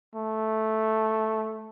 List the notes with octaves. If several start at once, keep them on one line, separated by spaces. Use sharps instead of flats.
A3